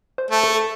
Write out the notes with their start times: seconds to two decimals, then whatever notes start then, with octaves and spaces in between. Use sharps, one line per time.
0.18 C5
0.31 A3
0.44 A4